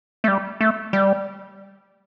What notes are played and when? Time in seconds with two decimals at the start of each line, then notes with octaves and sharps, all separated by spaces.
0.24 A3
0.28 G3
0.61 A3
0.93 G3